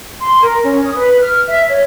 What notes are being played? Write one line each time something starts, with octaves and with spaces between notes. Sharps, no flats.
C6
A#4
C#4
D#6
B4
F6
E5
C#5